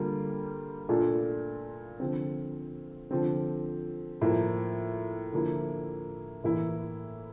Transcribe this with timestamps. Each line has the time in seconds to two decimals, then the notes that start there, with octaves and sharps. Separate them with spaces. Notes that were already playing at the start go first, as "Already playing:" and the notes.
Already playing: D3 G3 A#3 F4
0.89 A#2 A3 D4 F4
2.00 D3 F3 C4
3.11 D3 F3 C4
4.21 A2 F3 A#3
5.33 D3 F3 A#3 E4
6.44 A2 E3 A#3 E4